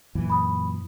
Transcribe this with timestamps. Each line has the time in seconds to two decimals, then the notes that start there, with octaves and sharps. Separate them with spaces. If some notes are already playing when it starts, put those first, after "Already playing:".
0.15 F#2 A#2 E3
0.30 B5 D#6